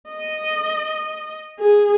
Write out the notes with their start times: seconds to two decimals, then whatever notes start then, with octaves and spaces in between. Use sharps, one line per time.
0.10 D#5
1.60 G#4